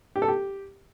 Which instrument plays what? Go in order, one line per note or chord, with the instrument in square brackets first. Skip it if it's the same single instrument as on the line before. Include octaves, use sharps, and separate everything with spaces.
[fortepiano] G4
A4
G4